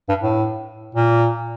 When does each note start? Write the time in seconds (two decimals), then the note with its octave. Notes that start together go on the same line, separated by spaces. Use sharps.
0.09 G2
0.23 A2
0.95 A#2